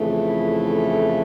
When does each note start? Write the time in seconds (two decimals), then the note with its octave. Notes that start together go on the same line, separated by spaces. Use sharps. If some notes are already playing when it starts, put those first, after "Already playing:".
Already playing: F2 C#3 E3 A3
0.25 E4